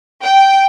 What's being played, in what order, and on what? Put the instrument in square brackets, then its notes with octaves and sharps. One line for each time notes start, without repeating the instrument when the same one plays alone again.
[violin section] G5